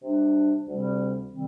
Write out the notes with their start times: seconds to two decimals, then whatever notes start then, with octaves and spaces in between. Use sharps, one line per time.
0.03 C3 G3 D4
0.68 D2 C3 G3 C4
1.31 C3 D#3 G3 C4